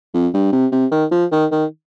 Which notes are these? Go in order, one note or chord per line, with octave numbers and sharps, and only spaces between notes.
F2
G2
C3
C3
D#3
F3
D#3
D#3